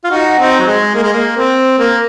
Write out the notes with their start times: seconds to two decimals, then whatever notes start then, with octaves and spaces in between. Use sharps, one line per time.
0.04 F4
0.11 D#4 F#4
0.39 C4 D#4
0.60 F#3
0.67 G#3
0.95 A#3
1.03 G#3
1.12 A#3
1.37 C4
1.79 A#3